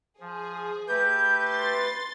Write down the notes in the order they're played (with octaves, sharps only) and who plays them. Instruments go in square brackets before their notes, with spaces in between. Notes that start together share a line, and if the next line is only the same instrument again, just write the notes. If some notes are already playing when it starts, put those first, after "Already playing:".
[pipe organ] F3 [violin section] G#4
[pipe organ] A3 G4 [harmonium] B4 [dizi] G6
[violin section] C6 A6